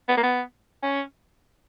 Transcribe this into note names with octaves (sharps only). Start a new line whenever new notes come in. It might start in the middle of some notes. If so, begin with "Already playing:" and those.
B3
A#3
B3
C#4